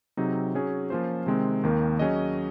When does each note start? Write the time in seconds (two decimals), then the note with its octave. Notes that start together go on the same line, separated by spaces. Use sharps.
0.17 C3 F#3 C4 D#4 G#4
0.55 F#3 C#4 G#4
0.90 F3 A#3 C#4 F4 C5
1.26 C3 D#3 G#3 C4
1.63 D#2 D#3 A#3
1.99 F#3 C#4 G#4 D#5